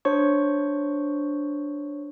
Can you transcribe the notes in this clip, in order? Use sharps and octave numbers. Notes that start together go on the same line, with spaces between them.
D4 C5 C#5 C#6